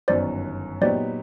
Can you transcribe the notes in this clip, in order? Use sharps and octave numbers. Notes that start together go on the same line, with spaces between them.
G1 F#2 D#3 F#3 B3 C5 D5
A#2 F#3 B3 D#4 G4 C5 D5